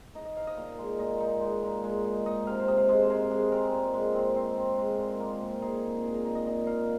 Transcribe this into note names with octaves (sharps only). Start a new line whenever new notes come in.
D#4 D#5
D#5
D#4 F5
D#5
A#2
G#3
A#2 D#5
D#4
G#3
A#2
G#3
D#4
D#4 D#5
C3 F5
C5
C3 D#5
F5
G#3 D#5
C5
G#3 A#4
G#3 G#4
C4 A#4
A#2
G#3
C4
C4
C4
G#3 A#4
A#2
A#3
A#2
D#4 G#4
A#2
A#2 G#4
A#4
D#4 D#5
D#5
A#2 D#5
D#4 F5